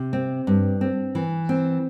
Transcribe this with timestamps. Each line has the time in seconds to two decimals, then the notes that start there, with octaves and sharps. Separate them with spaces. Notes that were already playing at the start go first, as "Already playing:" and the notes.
Already playing: C3
0.13 C4
0.47 G2
0.81 C4
1.15 E3
1.49 C4